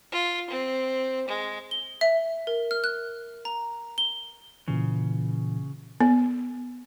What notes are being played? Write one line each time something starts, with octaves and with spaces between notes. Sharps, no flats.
F4
C4
G#3
G7
E5
A#4
F6
F#6
A#5
G7
A#2 C#3 E3
B3